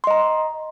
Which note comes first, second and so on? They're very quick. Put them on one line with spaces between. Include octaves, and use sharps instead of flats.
C6 D#5 A#5